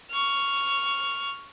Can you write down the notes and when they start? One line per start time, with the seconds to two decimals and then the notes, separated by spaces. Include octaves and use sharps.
0.11 C#6 F6